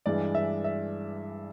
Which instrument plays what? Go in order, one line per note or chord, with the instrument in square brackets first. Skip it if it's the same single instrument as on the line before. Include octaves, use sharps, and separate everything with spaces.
[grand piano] G2 E3 G#3 [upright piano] D5
[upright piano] E5
E5